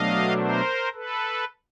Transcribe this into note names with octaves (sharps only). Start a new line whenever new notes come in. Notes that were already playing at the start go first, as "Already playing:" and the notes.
Already playing: B2 F#3 A3 D4 D#5 F5
A#4 C5
A4 B4